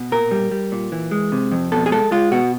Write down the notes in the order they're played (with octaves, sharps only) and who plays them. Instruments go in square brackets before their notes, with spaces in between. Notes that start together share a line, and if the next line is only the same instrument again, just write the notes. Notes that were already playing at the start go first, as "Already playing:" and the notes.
Already playing: [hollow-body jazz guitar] B2
A#2 A#4
G3
G3
A#2
E3
G#3
C3
F2
B2 A4
G#4
G#3 A4
G#3 F4
B2 F#4